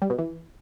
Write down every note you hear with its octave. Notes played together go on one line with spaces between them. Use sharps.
G3
B2
E3